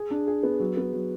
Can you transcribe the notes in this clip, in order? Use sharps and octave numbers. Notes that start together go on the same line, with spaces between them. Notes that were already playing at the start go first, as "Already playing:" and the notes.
Already playing: G#4
D4
G#4
B3
F#3
B3
F#3